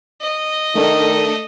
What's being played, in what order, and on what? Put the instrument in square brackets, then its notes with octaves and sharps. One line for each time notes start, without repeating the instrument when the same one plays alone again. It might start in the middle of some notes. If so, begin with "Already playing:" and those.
[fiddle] D#5
[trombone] D#3 [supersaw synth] A3 D4 A4